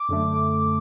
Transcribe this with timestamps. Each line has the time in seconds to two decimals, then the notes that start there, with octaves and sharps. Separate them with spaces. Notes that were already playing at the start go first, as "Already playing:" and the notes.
Already playing: D6
0.08 F#2 D3 A3